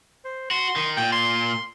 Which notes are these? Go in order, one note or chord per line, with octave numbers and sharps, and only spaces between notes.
C5
F#4 C6
D#3
A#2 G5
C6